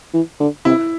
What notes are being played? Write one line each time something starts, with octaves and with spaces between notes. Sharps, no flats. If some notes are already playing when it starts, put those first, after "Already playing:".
E3
D3
C3 E4